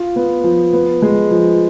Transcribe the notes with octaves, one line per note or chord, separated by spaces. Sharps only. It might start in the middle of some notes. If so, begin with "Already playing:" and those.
Already playing: F4
B3
F3
B3
G#3
F3